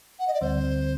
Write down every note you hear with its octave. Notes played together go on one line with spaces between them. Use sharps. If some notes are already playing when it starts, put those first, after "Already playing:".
F#5
D#5
D5
D2 D3 G3 C4 C5